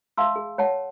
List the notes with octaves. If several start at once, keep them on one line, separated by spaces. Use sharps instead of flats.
E5 F5 A5 C6 E6
G#4
C#5 F#5 A5